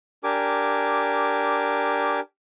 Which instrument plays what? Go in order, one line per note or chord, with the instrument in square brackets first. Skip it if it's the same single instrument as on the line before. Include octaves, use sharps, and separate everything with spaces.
[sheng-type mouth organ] D4 G4 A#4 G#5 D6